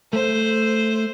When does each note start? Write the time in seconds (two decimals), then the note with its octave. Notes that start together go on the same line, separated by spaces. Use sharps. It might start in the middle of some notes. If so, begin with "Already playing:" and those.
0.13 A3 C5